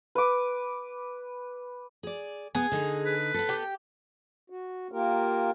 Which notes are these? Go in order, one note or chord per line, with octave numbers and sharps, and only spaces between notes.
B4 D6
G#4 D5
B3 G#4
D3 D#4
B4
B3 A4
G4
F#4
A#3 F4 G4 A#4